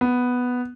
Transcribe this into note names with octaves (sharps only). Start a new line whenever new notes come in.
B3